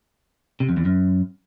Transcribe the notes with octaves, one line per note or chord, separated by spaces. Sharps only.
C3
F2
E2
F#2